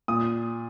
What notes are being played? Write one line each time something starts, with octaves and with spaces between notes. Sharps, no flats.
A#2 D#6